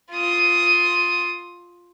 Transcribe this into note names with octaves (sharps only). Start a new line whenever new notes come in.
F4 D#6